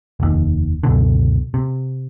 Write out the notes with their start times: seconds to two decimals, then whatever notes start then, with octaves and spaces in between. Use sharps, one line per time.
0.20 F1 D#2
0.83 C#2 F#2 B2 D3
1.54 C3